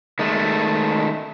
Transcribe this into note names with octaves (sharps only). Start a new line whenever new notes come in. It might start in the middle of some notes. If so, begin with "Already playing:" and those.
D#3 G#3 A3